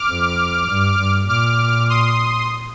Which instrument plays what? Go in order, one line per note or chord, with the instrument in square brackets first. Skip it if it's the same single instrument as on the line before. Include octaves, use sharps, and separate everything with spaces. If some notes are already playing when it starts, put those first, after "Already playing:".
Already playing: [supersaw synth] D6 F6
[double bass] F2
G2
G2
[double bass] A#2 [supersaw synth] D6 F6
[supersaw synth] C6 D#6